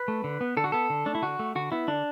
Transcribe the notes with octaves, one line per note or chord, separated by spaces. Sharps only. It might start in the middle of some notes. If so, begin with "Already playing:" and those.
Already playing: B4
A3
D3
B3
D3 A4
F#4
B3 A4
D3
A3 D4
E4
D3 F#4
A3
D3 F#4
B3 E4
D3 D4